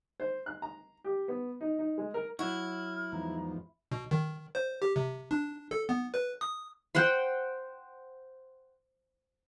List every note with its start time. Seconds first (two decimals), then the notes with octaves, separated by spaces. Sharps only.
0.20 C5
0.46 F#6
0.62 A#5
1.04 G4
1.28 B3
1.61 D#4
1.79 D#4
1.98 G#3
2.14 A#4
2.39 F#3 E4 F#4 F6
3.12 E2 G#2 F3 A#5
3.91 B2
4.11 D#3
4.55 C5
4.82 G4
4.96 C3
5.31 D4
5.71 A4
5.89 B3
6.14 B4
6.41 D#6
6.95 C5 F#5 G5 C6